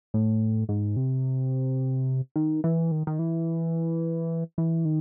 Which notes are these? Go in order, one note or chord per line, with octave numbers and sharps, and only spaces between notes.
A2
G#2
C3
D#3
E3
D#3
D#3
E3
E3
D#3